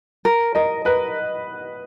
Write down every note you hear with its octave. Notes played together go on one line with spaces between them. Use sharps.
A#4
A#4 D#5
A#4 B4